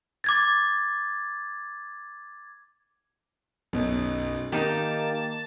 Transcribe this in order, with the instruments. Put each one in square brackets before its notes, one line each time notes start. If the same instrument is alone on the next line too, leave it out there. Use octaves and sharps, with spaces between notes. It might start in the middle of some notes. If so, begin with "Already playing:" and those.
[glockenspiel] D6 G#6 A6
[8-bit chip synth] B1 [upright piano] F#2 B2
[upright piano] D#3 [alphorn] A#3 [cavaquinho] D#4 G4 [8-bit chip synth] A5